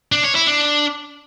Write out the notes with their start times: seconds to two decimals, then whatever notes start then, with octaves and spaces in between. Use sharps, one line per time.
0.12 D4
0.24 C#5
0.35 E4
0.47 D4